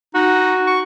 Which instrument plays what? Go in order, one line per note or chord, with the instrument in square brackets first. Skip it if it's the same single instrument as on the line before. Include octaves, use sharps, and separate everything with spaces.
[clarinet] D#4 [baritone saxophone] F#4
[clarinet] C#6